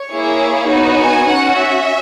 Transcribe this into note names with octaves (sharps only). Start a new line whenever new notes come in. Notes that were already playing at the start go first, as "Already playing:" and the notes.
Already playing: C#5
A#3 E4 G#4
B3 D#4 F#4
G#5
C#4 F#4 F#5
E5